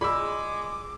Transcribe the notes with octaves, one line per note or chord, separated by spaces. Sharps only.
G#3 F4 G#4 D5 B5 D6 E6